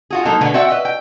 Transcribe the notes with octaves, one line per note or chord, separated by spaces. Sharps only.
F4 F#4 G#4
F#3 G#3 A#3 D#4 A4 C5
B2 D3 A3 B3 G#4
C4 F#4 D5 E5 F#5 G5
B4 D#5 E5
G5